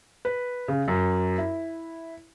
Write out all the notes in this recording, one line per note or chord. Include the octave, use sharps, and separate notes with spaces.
B4
C#3
F#2
E4